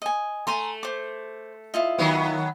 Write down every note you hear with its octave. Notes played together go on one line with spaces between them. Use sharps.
D#5 G#5
A3 G#5 A#5 C6
C5 D6
E4 F4 D#5
D#3 F#3 B3